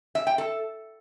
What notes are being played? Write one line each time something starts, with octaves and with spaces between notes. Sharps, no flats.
E5
G5
A4